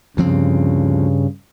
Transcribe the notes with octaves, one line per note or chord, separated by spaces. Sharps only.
D2 G2 C#3 F3 C4